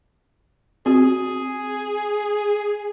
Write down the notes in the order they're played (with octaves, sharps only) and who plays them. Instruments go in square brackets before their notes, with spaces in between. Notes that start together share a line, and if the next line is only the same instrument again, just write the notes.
[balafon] C4 F#4 [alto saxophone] G#4